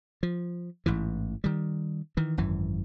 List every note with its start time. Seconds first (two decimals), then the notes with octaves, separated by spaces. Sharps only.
0.23 F3
0.86 A1 G#2 E3
1.44 D#3 G3
2.17 D#3 E3
2.38 G#1 F#2 E3